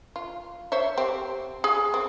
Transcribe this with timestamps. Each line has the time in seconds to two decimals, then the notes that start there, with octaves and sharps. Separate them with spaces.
0.16 F4
0.72 C5 C#5 E5
0.98 C4 G4
1.64 G#4 G#5
1.94 C4